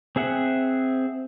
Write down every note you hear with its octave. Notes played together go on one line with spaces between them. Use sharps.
C4 G#4 E5 F#5